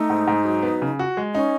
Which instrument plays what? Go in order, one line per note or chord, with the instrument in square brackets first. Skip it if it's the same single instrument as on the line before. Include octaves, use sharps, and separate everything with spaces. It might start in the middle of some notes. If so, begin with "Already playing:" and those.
Already playing: [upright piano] A3 [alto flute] D#4
[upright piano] G#2
G#2
F#3
B3
C#3
F#4
G#3
[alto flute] C#4 [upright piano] D#4